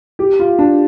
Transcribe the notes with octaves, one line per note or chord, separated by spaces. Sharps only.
G4
F4
D4